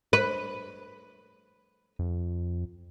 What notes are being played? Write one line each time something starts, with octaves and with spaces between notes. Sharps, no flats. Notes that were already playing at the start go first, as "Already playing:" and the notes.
B4
F2